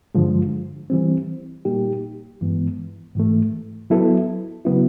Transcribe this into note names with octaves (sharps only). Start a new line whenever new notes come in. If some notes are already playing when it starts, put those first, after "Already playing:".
G2 D3 F3 G#3
E3 G3 C4
A#2 G3 A#3 D#4 G4
G2 E3 G#3 B3
G#2 E3 A3
F#3 B3 E4 A4
C#3 F#3 B3 E4